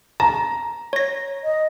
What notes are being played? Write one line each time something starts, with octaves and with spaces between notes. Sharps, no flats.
A5 A#5
C#5 A#6
D#5